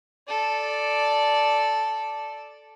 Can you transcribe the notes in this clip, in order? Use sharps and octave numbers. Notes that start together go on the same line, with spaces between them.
A4 D5